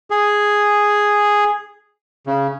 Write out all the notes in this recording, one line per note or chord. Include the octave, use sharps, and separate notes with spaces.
G#4
C#3